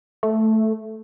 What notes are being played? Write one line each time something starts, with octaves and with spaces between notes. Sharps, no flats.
A3